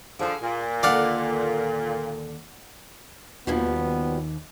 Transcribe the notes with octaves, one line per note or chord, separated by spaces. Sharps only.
D3 F3 G#4 G#5
A#2
D#2 D3 A4 D5 F5 F#5
D#2 B2 F3 G3 B3